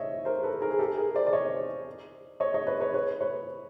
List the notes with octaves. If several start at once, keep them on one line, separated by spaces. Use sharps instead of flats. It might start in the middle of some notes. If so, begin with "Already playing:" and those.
Already playing: C#5 D#5 E5
A#4 C5
A4 B4
G#4 A#4
G#4
G4 A4
G#4 A#4
C5 D5
D5
C#5 D#5
C#5 D#5
C#5 D#5
B4 C#5
B4 C#5
B4 C#5
B4 C#5